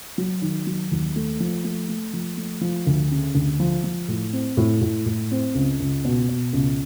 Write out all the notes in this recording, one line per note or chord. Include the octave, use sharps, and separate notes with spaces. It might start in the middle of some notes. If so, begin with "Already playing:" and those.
F#3
D#3
F#3
D#2
A3
F3
A3
A3
F3
A3
F3
D2
C#3
D2
F3
F3
A2
C4
A2
A2
A2
C4
C#2
C#2
B2
B2
C#2